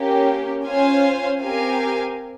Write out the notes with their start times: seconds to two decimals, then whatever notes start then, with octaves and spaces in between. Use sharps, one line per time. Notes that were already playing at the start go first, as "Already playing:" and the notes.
Already playing: A#3 C#4 G4
0.65 C#4 F4 C5 F5 G#5
1.40 C4 G4 A#4 F5 G#5